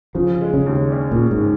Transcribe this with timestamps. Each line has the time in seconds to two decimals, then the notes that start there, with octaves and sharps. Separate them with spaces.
0.15 C#3 F3
0.41 G#3
0.54 C#3
0.66 D#2
0.92 C#4
1.12 A#2
1.18 C#3
1.31 G#2